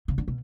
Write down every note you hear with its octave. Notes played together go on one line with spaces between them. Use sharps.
C#3
D3
B2